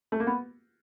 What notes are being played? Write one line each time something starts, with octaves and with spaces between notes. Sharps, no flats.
A3
A#3
B3